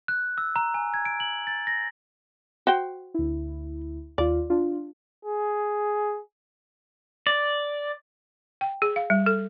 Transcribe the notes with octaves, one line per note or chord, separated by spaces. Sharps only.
F#6
E6
A#5
G#5
G#6
D7
F#7
A6
A#6
F#4 C5 G5
D2 E4
D#2 F4 D5
D4 F4
G#4
D5
G5
G#4
F5
G3
A4